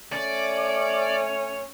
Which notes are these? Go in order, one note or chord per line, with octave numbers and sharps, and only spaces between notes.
A3 C#4 D5